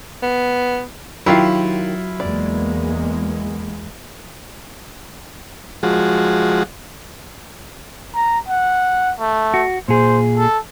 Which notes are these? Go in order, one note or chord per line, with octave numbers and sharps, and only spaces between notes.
B3
D#3 F#3 E4 F4 G4 F5
E2 G#3 A#3 D5
F3 G#3 F#4
A#5
F#5
A3
F#4
A#2 G#4 C5
A4